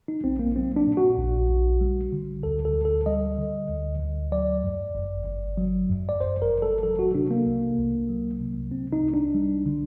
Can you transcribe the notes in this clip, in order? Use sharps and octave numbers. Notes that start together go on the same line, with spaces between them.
D#4
A#1 C4
A#3
F#3 C4
D4
A#2
F#4
A#1
A#1
G3
D3
D2 A4
A4
D2
A4
G3 D#5
D3
D2
D2
F#3 D5
F#2
G1
G1
F#3
F#2
D5
G1 C5
A#4
G1
A4
F#3 A4
F#4
C3 D4
A#3
C2
C2
F#3
C3
C2 C4
D#4
C2
D4
G3
D3